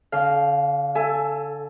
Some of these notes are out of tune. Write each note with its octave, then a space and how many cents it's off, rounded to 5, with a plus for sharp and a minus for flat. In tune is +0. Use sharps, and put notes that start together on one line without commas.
D3 -40 F5 +0
A4 +0 E5 +20 G#5 +5